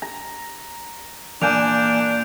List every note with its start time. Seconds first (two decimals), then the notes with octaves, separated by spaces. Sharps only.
0.02 A#5
1.42 A#2 E3 A#3 D4 G#5 G6 D7 F7